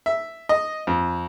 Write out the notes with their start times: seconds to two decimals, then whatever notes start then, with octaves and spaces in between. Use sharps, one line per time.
0.06 E5
0.49 D#5
0.87 F2